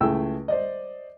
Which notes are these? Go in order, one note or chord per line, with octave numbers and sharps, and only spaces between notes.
C#2 A3 E4 G#4 G5 E6
C5 D5 D#5